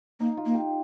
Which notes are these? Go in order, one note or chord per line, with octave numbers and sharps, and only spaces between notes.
A#3 D#4
F4
A#3
G4